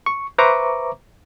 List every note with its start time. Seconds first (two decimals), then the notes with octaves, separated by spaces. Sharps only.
0.06 C#6
0.38 B4 C5 E5 A#5 C#6 D6